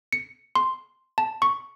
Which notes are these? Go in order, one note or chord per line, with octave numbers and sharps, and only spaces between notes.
C#7
C6
A5
C#6